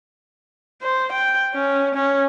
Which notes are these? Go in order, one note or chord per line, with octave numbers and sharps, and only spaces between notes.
C5
G5
C#4
C#4